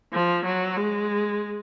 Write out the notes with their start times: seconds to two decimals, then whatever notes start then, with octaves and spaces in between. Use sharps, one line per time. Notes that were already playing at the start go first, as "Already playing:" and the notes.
0.13 F3
0.45 F#3
0.77 G#3